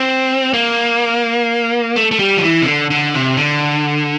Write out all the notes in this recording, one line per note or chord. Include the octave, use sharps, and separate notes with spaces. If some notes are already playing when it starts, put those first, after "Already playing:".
Already playing: C4
A#3
A3
A3
G3
F3
E3
C3
D3
D3
C3
D3